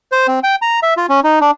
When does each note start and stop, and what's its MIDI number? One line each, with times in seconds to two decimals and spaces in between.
0.12 0.27 72
0.28 0.40 60
0.43 0.56 79
0.62 0.80 82
0.83 0.94 76
0.97 1.06 65
1.09 1.20 61
1.24 1.39 63
1.41 1.51 62